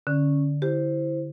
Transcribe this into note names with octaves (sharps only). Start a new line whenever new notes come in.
D3 C#4
E4 G4 C5